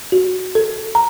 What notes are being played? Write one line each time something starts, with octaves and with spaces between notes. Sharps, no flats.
F#4
A4
A#5